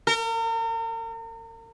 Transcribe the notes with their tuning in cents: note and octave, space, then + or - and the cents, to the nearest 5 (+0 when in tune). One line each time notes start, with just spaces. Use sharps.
A#4 -40